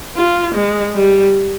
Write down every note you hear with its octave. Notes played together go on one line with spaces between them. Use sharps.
F4
G#3
G3